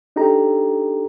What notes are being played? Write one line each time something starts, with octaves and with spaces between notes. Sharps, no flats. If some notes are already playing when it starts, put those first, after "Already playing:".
D4 D#4 G4 A4 A#5